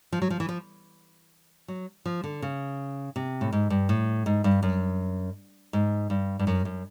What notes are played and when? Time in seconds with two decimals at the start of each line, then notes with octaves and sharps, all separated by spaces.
0.12 F3
0.22 F#3
0.30 F3
0.40 E3
0.49 F3
1.68 F#3
2.05 F3
2.24 D3
2.42 C#3
3.16 C3
3.41 A2
3.53 G#2
3.70 G2
3.89 A2
4.26 G#2
4.44 G2
4.63 F#2
5.73 G#2
6.10 G2
6.39 G2
6.47 F#2
6.65 F#2